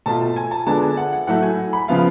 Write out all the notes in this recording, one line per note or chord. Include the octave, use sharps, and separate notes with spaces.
B2 A3 F4 A5
A5
G#5
A5
D3 G#3 B3 D4 F4 A5
G#5
F#5
F#5
A2 F#3 A3 F#5
G#5
B5
C#3 F3 B3 F4 F5